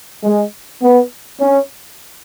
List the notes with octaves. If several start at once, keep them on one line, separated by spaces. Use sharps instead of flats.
G#3
B3
C#4